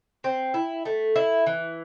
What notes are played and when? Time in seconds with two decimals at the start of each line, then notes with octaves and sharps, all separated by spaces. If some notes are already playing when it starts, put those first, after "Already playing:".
0.24 C4
0.54 E4
0.85 A3
1.16 E4
1.46 E3